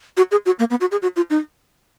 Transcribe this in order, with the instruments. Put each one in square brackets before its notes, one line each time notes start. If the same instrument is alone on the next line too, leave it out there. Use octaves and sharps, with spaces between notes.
[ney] F#4
G#4
F#4
A#3
B3
F#4
G#4
F#4
F4
D#4